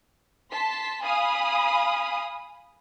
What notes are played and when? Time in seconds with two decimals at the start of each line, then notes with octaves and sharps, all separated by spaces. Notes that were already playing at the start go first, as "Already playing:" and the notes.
0.52 A5 C6 B6
1.03 F5 G#5 B5 D#6